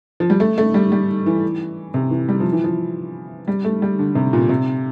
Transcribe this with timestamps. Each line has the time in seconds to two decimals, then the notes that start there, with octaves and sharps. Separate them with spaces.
0.20 F3
0.30 G3
0.40 A3
0.58 A3
0.74 G3
0.92 G3
1.26 E3
1.94 C3
2.11 E3
2.29 G3
2.40 F3
2.52 E3
2.64 F3
3.48 G3
3.64 A3
3.82 G3
3.99 D3
4.15 C3
4.33 A#2
4.49 C3